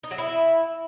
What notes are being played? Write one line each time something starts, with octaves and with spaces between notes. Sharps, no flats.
D#4
F#3
E4